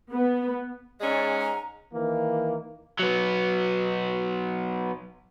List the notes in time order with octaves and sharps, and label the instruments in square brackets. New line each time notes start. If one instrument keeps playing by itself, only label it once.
[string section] B3
[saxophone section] G#2 G#3 C#4 [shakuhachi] D5
[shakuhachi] A#5
[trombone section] D#3 E3 A#3
[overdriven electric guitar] F#3 B3